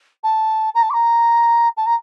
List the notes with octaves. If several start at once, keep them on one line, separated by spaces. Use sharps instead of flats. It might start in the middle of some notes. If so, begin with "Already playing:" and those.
A5
A#5
A5
D6
A#5
A5
A#5